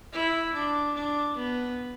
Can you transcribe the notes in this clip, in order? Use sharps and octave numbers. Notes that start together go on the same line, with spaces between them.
E4
D4
D4
B3